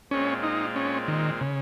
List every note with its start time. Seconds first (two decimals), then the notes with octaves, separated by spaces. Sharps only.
0.11 A#2 G#3 C4 C#4 F4
0.43 D#4
0.76 C#4
1.08 D#3
1.41 C#3